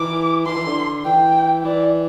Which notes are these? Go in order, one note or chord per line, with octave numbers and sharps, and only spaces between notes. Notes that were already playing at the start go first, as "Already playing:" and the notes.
Already playing: E3 D6
E3 C6
E3
D3
E3 G5
E3 D5